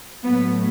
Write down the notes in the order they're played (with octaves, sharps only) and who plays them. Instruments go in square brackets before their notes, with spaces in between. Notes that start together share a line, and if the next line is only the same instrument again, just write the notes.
[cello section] A2 F#3 A3 B3